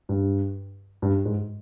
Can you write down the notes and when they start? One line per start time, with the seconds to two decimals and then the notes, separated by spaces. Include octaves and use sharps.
0.09 G2
1.02 G2
1.25 G#2